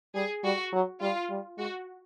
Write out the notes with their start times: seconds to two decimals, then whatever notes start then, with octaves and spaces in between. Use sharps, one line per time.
0.15 G3 G#4
0.44 G3 F#4
0.73 F#3
1.01 G3 F4
1.30 G3
1.58 G#3 F#4